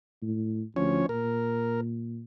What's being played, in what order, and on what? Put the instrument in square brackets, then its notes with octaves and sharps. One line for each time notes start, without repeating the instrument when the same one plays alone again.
[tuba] A2
[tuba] D2 [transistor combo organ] F3 C#4 C#5
[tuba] A#2 [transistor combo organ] A#4